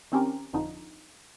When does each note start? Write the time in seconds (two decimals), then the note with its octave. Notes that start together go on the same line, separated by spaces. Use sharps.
0.12 D#3 C4 C#4 G4 A#4
0.53 G1 F2 D3 F3 D#4